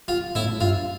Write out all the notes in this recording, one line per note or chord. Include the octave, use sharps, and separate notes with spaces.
F4
A2 E4
G2 F4